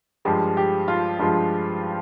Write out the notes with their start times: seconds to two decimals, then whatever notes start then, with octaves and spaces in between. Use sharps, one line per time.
0.25 G2 F3 G#3 G4
0.57 G4
0.88 F4
1.19 G2 F3 G#3 F4